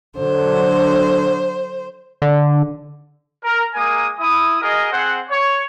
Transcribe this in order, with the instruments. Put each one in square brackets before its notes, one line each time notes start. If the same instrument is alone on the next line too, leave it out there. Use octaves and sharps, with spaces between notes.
[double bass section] D3 F#3 [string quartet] C5
[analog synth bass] D3
[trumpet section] A#4
G#3 A#3 A#4 G#5 D#6
E4 D#6
F#4 G#4 A#4 D#5
C4 G#4 C5 F#5
C#5